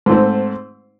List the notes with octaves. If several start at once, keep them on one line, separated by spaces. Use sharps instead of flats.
G#2 A3 C4